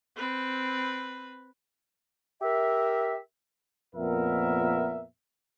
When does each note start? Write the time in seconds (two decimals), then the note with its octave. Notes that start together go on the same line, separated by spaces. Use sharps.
0.16 C4 B4
2.41 G4 A#4 E5
3.95 F2 A#2 B3 A#4 E5